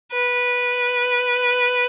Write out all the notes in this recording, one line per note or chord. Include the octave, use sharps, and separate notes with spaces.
B4